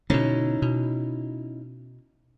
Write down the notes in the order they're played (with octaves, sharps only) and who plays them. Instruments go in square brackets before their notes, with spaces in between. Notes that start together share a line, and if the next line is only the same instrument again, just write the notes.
[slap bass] B2 D3 [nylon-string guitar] C#4 D#4 E4
[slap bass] B2